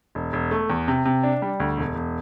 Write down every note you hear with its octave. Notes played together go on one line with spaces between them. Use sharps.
E1
E1
A3
E2
C3
C3
D4
G3
D2
E1
E1